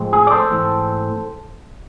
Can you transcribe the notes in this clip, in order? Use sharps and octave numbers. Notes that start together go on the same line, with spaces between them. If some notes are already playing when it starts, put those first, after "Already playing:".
Already playing: A2 F3 G#3 C4
G#4
D5
A4 C5
G#2 E3 A3 C4